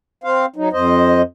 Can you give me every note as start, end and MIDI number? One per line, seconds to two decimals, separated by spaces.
0.24 0.46 60
0.24 0.46 72
0.24 0.46 77
0.56 0.69 54
0.56 0.69 63
0.73 1.22 41
0.73 1.22 72
0.73 1.22 75